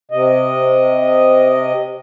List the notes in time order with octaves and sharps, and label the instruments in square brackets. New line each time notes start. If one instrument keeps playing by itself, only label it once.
[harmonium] C3 D#5